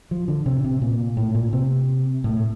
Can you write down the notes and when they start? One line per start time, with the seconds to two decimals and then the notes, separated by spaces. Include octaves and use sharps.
0.11 F3
0.28 D3
0.46 C3
0.64 C3
0.82 A#2
1.17 A2
1.35 A#2
1.53 C3
2.24 A2